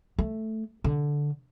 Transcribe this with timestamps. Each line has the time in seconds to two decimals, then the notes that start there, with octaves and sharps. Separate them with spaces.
0.19 A3
0.84 D3